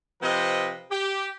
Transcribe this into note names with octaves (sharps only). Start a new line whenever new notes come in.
C3 F3 C4 B4 D#5
G4